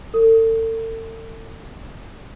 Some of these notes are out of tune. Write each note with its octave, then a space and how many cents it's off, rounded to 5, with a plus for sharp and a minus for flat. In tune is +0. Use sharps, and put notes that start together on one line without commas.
A4 +40